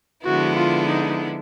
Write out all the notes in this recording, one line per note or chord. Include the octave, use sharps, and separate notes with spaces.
D3 F3 G#3 B3 E4 F#4
F4
D#4